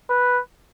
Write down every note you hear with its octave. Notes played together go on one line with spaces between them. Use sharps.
B4